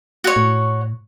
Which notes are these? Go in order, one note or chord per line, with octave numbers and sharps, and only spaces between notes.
F#4 C#5
A2